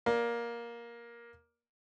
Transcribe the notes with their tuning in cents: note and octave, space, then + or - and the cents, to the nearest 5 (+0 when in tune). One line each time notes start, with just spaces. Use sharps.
A#3 +15 D5 +0